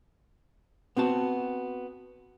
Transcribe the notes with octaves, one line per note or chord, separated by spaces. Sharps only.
B3 C4 F#4 A5